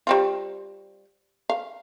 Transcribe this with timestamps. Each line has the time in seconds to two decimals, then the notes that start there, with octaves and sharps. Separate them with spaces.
0.07 G3 C4 F4
1.50 F5